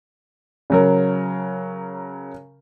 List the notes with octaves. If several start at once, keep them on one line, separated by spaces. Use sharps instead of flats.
C#3 F#3 A#4